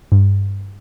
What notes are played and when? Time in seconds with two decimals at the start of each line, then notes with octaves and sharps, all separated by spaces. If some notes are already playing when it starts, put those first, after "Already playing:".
0.12 G2